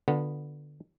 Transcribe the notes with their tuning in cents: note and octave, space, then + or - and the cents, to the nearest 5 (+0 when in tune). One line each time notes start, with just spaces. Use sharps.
D3 +10 B3 +0 F4 +35